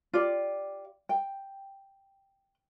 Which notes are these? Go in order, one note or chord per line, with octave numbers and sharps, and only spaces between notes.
F4 G4 D5
G5